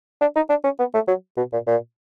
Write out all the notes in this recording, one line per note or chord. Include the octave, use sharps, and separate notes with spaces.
D4
D#4
D4
C#4
B3
A3
F#3
B2
A#2
A#2